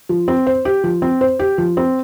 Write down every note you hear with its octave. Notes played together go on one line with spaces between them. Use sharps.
F3
C4
C5
G4
F3
C4
C5
G4
F3
C4